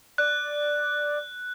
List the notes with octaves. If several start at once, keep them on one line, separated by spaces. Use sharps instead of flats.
D5 F#6